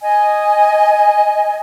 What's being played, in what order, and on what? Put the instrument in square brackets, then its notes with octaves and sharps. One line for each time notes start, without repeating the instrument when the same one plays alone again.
[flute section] D#5 G#5